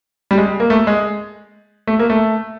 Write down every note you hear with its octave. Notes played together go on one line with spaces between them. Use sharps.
G3
G#3
A#3
A3
G#3
A3
A#3
A3